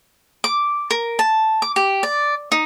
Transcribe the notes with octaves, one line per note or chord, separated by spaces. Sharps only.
D6
A#4
A5
D6
G4
D5
D#4